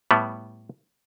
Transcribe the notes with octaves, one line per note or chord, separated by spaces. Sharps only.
A2 G3 B3